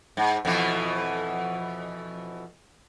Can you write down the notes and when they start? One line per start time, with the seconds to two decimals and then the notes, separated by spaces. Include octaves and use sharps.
0.17 G#2
0.45 F2 B2 E3